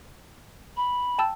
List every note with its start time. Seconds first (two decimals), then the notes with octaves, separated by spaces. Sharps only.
0.77 B5
1.18 G5 A5 E6